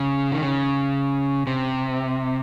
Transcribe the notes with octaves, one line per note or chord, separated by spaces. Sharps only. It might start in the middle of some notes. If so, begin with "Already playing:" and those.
Already playing: C#3
D#3
C#3
C3